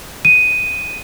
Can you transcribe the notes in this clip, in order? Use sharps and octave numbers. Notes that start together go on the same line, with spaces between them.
D#7